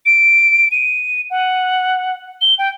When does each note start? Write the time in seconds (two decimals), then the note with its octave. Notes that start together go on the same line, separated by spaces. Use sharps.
0.06 D7
0.71 D#7
1.30 F#5
2.41 G7
2.59 G5